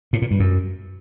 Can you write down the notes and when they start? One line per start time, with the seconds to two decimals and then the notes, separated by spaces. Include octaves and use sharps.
0.13 A2
0.22 A#2
0.31 G2
0.40 F#2